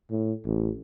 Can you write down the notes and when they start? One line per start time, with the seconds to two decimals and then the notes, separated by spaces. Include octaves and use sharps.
0.11 A2
0.46 A1